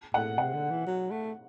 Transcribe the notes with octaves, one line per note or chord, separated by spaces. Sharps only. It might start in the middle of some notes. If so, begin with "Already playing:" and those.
A2 F#5
C3 F#5
D3
E3
F#3
A3